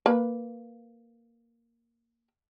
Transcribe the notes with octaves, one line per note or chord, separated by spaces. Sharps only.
A#3 B4